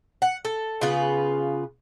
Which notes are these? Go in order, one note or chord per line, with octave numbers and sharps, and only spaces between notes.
F#5
A4
C#3 B3 F4 B4